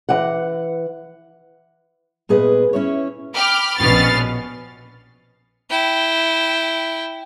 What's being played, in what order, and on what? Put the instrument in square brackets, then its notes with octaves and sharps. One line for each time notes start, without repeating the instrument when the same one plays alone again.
[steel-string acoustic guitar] E3 F#5
A#2 B3 G#4 B4 D#5
C#4 E4 C#5
[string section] G5 B5 D6 F6
A#1 B2 B3 C#4 F6 A6
[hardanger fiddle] E4 G5